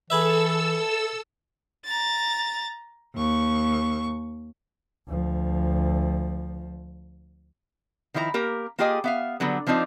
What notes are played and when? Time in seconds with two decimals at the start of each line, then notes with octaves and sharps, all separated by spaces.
0.10 E3 G#4 A4 B4 E5 E6
1.84 A#5 A6
3.15 D#2 C#6
5.07 D2 F3
8.14 D#3 F3 E4 C5 A#5
8.34 A#3 G4 A#4
8.79 A#3 F4 G4 G#4 D#5 G#5
9.04 B3 E5 F5
9.40 D3 F#3 G3 B3
9.67 F3 C4 D4 D#4 F4